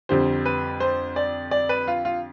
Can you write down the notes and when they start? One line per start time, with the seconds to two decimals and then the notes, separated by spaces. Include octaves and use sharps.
0.09 F2 D3 G3 C5
0.46 B4
0.80 C5
1.16 D5
1.51 D5
1.69 B4
1.88 F4
2.05 F4